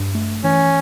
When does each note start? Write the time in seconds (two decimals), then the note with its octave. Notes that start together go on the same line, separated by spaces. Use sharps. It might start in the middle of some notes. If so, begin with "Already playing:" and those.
Already playing: G2
0.15 A3
0.44 E3 C#4